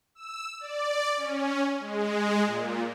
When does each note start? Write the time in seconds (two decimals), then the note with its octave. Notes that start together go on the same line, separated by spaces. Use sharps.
0.15 E6
0.60 D5
1.17 C#4
1.80 G#3
2.45 A#2